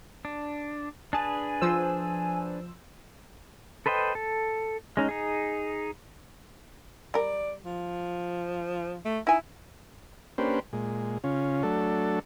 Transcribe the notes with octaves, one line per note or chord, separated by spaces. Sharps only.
D4
D4 G#4 B4 G#5 A5
F3 C5 E6
A4 B4 C5 D#5 G5
A4
G#3 C#4 D#4
D#4 G#4
G3 A#4 D5
F3
A3
D#4 E4 G#5
A#3 C#4 D4 G4 B4 C5
A#2 G#3
C#3 C#4 F4
F#3 A3 D4 A4